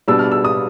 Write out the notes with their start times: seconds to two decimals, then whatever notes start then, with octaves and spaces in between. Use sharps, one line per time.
0.08 B2 G3 B3 D4 E6
0.19 F6
0.32 E6
0.45 D#6